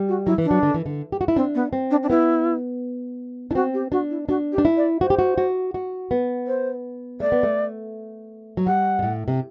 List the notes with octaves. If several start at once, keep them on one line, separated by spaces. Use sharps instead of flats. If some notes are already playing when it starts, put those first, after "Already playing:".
Already playing: G3
F#4
F#3 E4
E3
D4
F#3
D3
E3
D3
G4
F#4
E4
C4 D4
B3
C4
D4
D4
B3 E4
D4 E4
C4 F#4
G4
D4 F#4
E4
D4 F#4
G4
D4
E4
D5
F#4 C5
G4
F#4
F#4
F#4
B3
C5
A3 D5
B3
A3
F#3
G3 F#5
B2
A2
C3